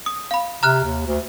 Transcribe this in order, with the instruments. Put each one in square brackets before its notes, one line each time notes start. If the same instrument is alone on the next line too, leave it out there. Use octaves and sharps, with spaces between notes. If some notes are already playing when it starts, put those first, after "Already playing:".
[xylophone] D#6
F5 B5
[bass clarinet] C3 [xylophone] A#5 F6 F#6
[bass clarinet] D#2
D2